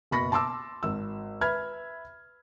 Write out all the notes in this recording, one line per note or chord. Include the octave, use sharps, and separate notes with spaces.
F#1 B2 B5 C#6 A#6
A5 C6 D6 E6
G#1 E6
B4 E5 B5 F6 G#6